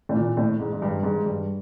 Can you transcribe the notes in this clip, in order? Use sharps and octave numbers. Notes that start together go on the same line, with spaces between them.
A2
A#2
A2
G#2
G#2
G2
G#2
G2